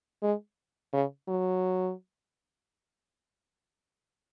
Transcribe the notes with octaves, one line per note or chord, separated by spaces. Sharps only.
G#3
C#3
F#3